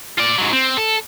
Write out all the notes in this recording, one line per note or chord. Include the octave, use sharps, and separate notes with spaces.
F4 D5
G#2 F#3
C4
A4